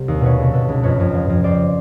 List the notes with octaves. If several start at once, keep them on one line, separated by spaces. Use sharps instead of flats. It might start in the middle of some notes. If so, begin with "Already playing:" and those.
Already playing: C2 G3 C5
D#2
B2 B4 C#5
C#2
B2 A4 B4
C#2
F2 B4 C#5
F2
F3
F2
F2 C5 D5